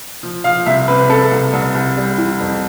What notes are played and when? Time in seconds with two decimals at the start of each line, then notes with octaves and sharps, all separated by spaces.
0.23 F3
0.44 F3 F5
0.66 C2 E5
0.88 C3 B4
1.09 C3 A4
1.31 C2
1.53 C2
1.74 C2
1.97 G3
2.18 E3
2.40 F2